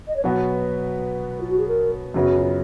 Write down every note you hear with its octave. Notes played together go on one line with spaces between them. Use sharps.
D#5
C#5
B2 F#3 B3 F#4 B4
F4
F#4
G#4
A#4
F#2 C#3 F#3 B3 F#4
F4